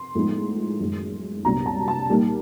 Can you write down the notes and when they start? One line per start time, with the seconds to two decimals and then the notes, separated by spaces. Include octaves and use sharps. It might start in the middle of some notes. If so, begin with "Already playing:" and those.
Already playing: C6
0.15 A2 F3 G#3 B3 D#4
0.79 F#2 D#3 G#3
1.45 C2 A#2 F#3 B3 D4 A#5
1.66 A5
1.88 A5
2.09 A#2 G3 A#3 D#4